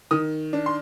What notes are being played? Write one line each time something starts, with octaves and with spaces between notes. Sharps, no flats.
D#3 D#6
D4
C6